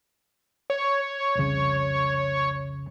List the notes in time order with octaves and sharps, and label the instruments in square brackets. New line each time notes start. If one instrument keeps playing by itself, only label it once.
[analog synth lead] C#5
[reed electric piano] C2 F2 C#3